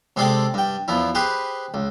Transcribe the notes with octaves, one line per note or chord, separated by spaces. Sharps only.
C3 G#3 G#4 A4 D5 G5
G2 G5
E2 F3 E4
G4 G#4 B4 C5
C#2